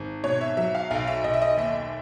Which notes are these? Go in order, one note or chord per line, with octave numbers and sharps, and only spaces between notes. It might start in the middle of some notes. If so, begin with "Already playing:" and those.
Already playing: G#1
B2 C#5
E5
F#3 E5
F5
B1 F5
E5
B1 D#5
E5
D#5
D#2 E5